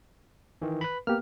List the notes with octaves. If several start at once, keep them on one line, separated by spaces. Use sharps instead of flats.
D#3 E3
B4 B5
A#3 B3 G4 F6